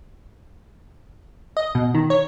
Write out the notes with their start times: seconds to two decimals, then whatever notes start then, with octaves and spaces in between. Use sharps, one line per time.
1.57 D#5
1.75 B2
1.94 D#3
2.10 C#5